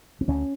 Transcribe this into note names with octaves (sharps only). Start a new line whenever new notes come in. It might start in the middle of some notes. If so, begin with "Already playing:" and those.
C4
D2 C#4